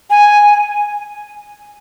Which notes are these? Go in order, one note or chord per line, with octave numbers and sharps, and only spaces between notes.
G#5